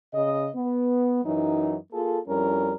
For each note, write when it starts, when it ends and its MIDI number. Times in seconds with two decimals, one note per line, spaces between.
0.14 0.49 49
0.14 0.49 75
0.56 1.23 59
1.24 1.76 42
1.24 1.76 52
1.24 1.76 54
1.24 1.76 63
1.93 2.18 58
1.93 2.18 65
1.93 2.18 68
1.93 2.18 69
2.28 2.74 41
2.28 2.74 55
2.28 2.74 61
2.28 2.74 64
2.28 2.74 70